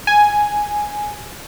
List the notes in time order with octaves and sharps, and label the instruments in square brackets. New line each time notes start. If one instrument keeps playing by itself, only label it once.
[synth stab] G#5